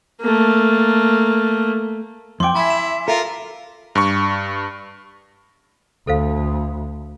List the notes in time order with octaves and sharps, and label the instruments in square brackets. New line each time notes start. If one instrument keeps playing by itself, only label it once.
[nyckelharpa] A3 A#3
[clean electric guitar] F2 G5 [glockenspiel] C6 D6
[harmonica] E4 [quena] E5 [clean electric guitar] G#5 A5 B5
[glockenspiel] E7
[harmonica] F4 A#4 [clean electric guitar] A4
[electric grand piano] G2 C#6
[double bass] D2 [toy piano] A4 C5 F5